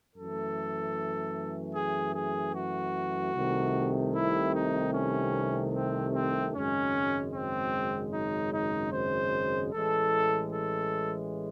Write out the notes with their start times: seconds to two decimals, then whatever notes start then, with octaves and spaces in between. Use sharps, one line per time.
0.15 F#2 E3 A3 A4
1.75 G#4
2.15 G#4
2.54 F#4
3.34 C2 C3 D#3 A3
4.15 E4
4.54 D#4
4.94 C#4
5.74 C4
6.14 C4
6.54 G#1 F#2 C#3 G#3 C#4
7.34 C4
8.13 D#4
8.53 D#4
8.93 C5
9.73 A1 A2 E3 G#3 A4
10.53 A4